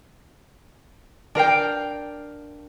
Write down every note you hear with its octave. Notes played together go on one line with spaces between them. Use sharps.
D4 A#4 F5 G5